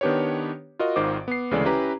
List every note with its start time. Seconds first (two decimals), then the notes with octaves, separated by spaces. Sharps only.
0.01 D#3 B3 D4 G4 B4 C#5
0.79 F4 F#4 A#4 D#5
0.96 G#1 G#2 D#3 F4 C5 D6
1.28 B3 C7
1.51 D2 C#3 E3 G#3 A4 D5
1.65 C#4 E4 G4 B4 A#5